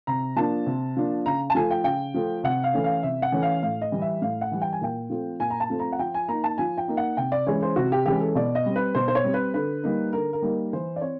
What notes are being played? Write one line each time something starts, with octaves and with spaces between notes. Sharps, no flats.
C3 A#5
F3 A#3 D4 A5
C3
F3 A#3 D4
C#3 A#5
A5
F3 A3 G#5
G5
C#3 G5
F3 A3
C3 F#5
F5
E3 A3 C#4
F5
C3 E5
F#5
E3 A3 C#4
F5
A2 F5
D#5
E3 G3
E5
A2 F5
F#5
E3 G3
G5
G#5
A#2 G5
F3 A3 C4
A#2 G#5
A#5
A5
F3 A3 C4
A#5
F#5
F3 G5
G#5
A#3 D#4 A#5
A5
F3 G#5
G5
A#3 D#4
F#5
C3 G5
D5
E3 G#3 C#4 C#5
C5
C3 F#4
G4
E3 G#3 C#4 G4
A4
B2 D5
D#5
G3 C4
B4
B2 C5
C5
C#5
G3 C4
B4
D3 B4
G3 A#3 D#4
D3 A#4
A#4
G3 A#3 D#4
E3 C5
D5
C4 C#5